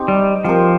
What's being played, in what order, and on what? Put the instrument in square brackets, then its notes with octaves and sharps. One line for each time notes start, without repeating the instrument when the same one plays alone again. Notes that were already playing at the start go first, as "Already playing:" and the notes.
Already playing: [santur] C4 D#4 G4
[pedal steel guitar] G3
[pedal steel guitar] F3 [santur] C4 G4 A#4